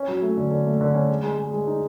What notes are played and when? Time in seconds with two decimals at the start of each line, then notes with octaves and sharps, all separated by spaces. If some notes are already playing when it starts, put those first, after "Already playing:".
Already playing: C#4
0.08 F#3
0.22 A3
0.37 D3
0.51 D3
0.66 A3
0.81 D3
0.95 C#4
1.10 G#3
1.23 G#3
1.38 G#3
1.53 G#3
1.67 D#4